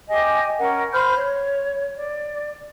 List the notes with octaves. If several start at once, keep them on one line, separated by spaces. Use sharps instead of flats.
G4 D#5 G#5
C#4 A#4 F#5
C5 B5 F6 G6
C#5
D5